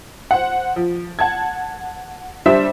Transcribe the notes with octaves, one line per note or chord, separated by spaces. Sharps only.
C5 F#5
F3
F#5 A5 G#6
G3 D4 C5 E5